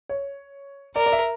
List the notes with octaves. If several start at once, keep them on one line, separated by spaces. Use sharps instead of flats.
C#5
A#4 D5
D5
E5